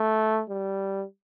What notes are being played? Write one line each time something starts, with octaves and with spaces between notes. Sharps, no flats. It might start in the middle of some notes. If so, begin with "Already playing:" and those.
Already playing: A3
G3